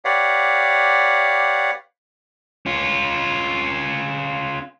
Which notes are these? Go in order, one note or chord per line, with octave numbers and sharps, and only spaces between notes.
G4 B4 C#5 D5 F5 F#5
C#4 F4